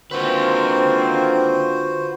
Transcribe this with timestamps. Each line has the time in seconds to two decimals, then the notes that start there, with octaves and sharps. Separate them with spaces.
0.11 D3 D#3 A#3 C4 F4 F#4 B4 C5